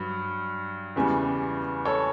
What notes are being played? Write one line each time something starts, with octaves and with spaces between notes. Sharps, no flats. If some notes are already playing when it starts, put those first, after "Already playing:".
Already playing: G2 F#3
E2 C#3 E3 G3
A4 C#5